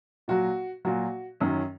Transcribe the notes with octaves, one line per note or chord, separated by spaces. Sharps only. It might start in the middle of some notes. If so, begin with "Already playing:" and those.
A#2 F#3 F#4
A#2 F#3 F#4
F#2 D#3 F#3 C#4